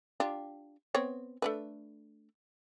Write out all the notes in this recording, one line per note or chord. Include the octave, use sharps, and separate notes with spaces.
D4 F4 G4
B3 C4 C#5
A3 D4 B4